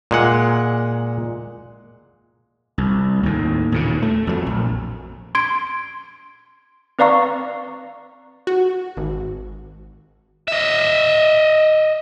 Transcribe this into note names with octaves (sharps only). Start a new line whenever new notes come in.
A#2 G#3 F#5
C2
D#2 A2
D#2 A#2 C#3
A3
F2 F#3
A#1
C6 G#6 D7
C4 B4 D5 F5 A#5 C#6
F#4
G#1
D#5 E5